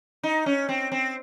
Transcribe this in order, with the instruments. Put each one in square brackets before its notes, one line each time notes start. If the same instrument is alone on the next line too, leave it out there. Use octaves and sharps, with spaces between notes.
[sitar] D#4
C#4
C4
C4